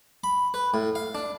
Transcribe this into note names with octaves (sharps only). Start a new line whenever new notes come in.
B5
B4
A2
F5
D4